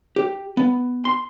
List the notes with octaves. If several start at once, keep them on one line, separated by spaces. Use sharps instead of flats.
G4
B3
C6